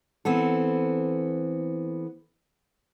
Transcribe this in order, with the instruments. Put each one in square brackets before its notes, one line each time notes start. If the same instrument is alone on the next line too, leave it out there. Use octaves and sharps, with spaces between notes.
[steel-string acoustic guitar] E3 B3 C4 A4